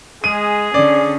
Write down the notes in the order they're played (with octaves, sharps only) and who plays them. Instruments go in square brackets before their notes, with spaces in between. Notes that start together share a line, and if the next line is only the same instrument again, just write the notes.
[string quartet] G#3 [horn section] G#4 [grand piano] D#7
[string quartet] D3 C#4 [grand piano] D5